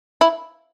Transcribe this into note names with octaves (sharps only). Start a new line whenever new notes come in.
E4